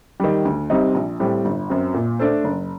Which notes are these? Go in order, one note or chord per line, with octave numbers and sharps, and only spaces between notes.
D#3 G3
D2
C3 G3 C4 D#4
A#1
A2 G3 C4
G1
F#2 F#3 C4
A#2
A3 D4 A4 C5
F#1